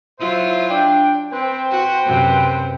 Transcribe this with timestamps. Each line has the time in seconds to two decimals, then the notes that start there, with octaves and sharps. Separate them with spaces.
0.20 F#3 E4 F4 C5 E5
0.69 D4 G5
1.32 C4 B4 C5 G5
1.71 F#4
2.06 F#2 C3